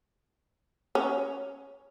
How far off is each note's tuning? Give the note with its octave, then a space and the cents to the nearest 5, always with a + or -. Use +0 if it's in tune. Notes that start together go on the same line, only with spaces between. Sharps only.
C#4 -5